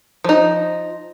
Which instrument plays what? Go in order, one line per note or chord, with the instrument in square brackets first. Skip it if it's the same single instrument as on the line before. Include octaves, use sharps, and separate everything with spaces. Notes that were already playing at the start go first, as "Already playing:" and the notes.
[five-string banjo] F3 D#4